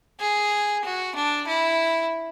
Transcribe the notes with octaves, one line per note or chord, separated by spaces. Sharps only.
G#4
F#4
D4
E4